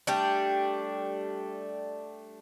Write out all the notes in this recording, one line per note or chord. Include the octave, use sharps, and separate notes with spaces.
G3 A3 D4